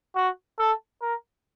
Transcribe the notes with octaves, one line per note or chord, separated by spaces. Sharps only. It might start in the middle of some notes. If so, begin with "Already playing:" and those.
F#4
A4
A#4